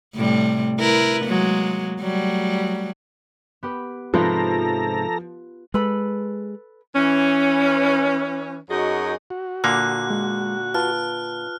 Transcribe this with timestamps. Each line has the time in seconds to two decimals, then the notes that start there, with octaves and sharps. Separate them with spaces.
0.15 A2 C3 G3
0.79 E4 A#4 B4
1.25 F#3 G#3 A#3
2.00 F#3 G3 A3
3.63 B3 G4 B4
4.14 G#2 C3 F3 F4 A4 B4 A#5
5.74 G#3 A4 B4 B5
6.95 E3 C#4
8.69 F#2 D#4 F#4 G#4 D#5
9.30 F#4
9.64 A#2 D3 A#3 F#6
10.10 G#3
10.75 F4 B4 A5 F6